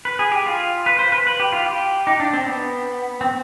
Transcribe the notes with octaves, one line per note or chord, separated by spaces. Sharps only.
B4
G#4
G4
F4
B4
C5
B4
B4
G4
F4
G4
D#4
D4
C4
B3
C4